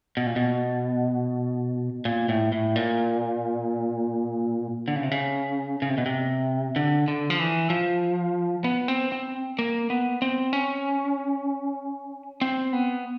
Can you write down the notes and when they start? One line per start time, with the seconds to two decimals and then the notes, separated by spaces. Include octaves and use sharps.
0.17 B2
0.26 A#2
0.36 B2
2.05 A#2
2.29 A2
2.52 A2
2.76 A#2
4.88 D3
4.96 C#3
5.03 C3
5.11 C#3
5.82 C#3
5.90 C3
5.98 B2
6.06 C3
6.76 D3
7.08 D3
7.30 F3
7.39 E3
7.70 F3
8.64 B3
8.88 C4
9.12 C4
9.59 A#3
9.90 B3
10.22 C4
10.53 C#4
12.41 C4
12.73 B3